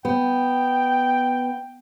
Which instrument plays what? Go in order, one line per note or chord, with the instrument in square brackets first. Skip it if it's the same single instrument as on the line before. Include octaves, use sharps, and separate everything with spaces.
[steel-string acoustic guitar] B3 [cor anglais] G5